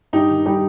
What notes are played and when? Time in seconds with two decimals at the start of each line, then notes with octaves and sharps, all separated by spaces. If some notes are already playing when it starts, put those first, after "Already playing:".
0.13 G2 D#4 G4
0.30 D#3
0.46 G3 D#4 G4